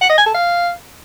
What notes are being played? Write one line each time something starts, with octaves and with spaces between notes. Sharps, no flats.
F#5
D#5
G#5
A4
F5